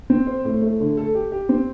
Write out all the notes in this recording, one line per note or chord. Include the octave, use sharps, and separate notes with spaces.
C4
C5
A2
A3
D3
A4
G4
G4
C4